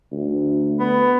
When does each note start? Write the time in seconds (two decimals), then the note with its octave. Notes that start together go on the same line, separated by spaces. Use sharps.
0.12 D2
0.80 B3